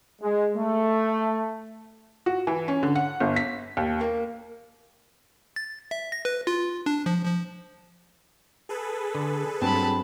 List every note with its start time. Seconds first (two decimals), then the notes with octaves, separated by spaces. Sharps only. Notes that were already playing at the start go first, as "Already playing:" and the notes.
0.21 G#3
0.56 A3
2.26 F#4
2.47 E3
2.68 C#4
2.83 D3
2.95 F#5
3.20 G1
3.36 B6
3.77 D#2
4.01 A#3
5.56 A6
5.91 E5
6.12 A#6
6.25 B4
6.47 F4
6.86 D4
7.06 F3
7.25 F3
8.69 G#4 A4 B4
9.15 D3
9.62 G2 F#3 C4 A5 B5